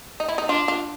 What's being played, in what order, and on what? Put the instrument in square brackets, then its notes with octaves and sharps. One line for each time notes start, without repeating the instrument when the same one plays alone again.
[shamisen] D#4
E4
D#4
[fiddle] D4 [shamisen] F4
[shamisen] F4